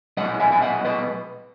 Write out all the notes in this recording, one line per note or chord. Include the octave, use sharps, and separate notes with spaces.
B1 A#2 G#3 D#5 F#5
E5 G#5
G#5
D#5 F#5
B4 D#5